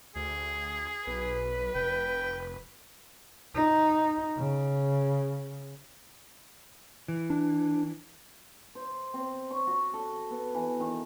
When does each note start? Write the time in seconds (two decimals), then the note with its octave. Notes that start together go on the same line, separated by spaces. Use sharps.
0.16 D2 G#4
1.07 B1 B4
1.75 F1 G5
3.55 D#4
4.37 C#3
7.08 E3
7.30 D4
8.75 C5
9.14 C4
9.51 C#6
9.67 F#4
9.94 A4
10.30 B3
10.54 E3
10.80 D#3